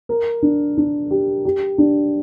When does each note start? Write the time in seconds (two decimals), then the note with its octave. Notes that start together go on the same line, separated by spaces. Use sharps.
0.09 A#4
0.42 D4
0.77 D4
1.11 G4
1.45 G4
1.78 D4